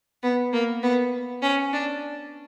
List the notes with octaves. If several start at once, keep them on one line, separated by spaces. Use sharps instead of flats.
B3
A#3
B3
C#4
D4